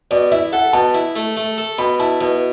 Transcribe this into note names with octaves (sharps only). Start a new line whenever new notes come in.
B2 D5
E4 E5
A4 F#5
B2 A5
E4
A3
A3
A4
B2 B5
E4 A5
B2 B4